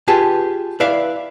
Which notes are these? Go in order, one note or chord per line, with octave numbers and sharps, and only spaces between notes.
F4 G4 G#4 B4 A5
E4 B4 D5 E5 F5